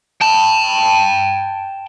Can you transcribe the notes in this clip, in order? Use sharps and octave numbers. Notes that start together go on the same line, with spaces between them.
G5 A5